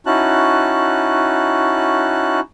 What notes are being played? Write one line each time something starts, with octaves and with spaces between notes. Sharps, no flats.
C#4 D#4 E4 F#4 A5 F#6